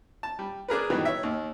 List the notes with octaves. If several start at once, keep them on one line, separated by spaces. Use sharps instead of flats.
A5
G3
D4 G#4 A#4 B4
B2 D#3 E3 F#3 G3
C#5 E5
D#2